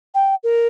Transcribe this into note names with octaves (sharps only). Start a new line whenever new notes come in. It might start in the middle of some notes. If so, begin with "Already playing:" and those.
G5
A#4